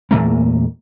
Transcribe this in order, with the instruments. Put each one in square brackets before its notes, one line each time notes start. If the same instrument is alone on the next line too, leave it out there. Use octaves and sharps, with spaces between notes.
[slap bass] E2 A#2 A3 A#3